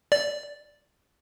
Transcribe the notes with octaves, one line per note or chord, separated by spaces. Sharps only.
D5